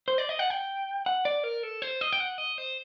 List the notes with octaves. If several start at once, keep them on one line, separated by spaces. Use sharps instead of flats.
C5
D5
D#5
F#5
G5
F#5
D5
A#4
A4
C5
D#5
G5
F#5
D#5
C5